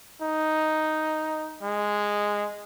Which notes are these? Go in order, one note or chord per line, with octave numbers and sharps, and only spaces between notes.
D#4
G#3